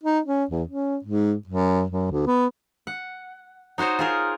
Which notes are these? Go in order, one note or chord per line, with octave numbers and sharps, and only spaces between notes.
D#4
C#4
E2
C#4
G#2
F#2
F#2
D2
B3
F#5
D#4 F#4 C5 C#5 D#5
F4 G#4 A#4